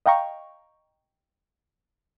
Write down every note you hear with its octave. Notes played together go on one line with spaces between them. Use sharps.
D#5 F5 G5 A#5 C#6